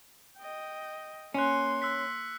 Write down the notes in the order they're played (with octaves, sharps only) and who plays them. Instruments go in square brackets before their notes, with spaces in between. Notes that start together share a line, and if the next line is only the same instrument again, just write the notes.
[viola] D#5 G5
[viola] A#3 C6 [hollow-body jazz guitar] C#4 [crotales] F#6 C#7
[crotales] E6 F#6 B6